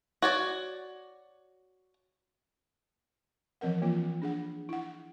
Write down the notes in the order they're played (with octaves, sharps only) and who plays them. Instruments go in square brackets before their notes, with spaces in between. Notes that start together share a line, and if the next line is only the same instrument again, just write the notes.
[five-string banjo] F#4 C#5 D5
[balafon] E3 F3 C4 A#4 F#5
E3 A#3 C4 F4
D4 G#4 F#5
E4 F#5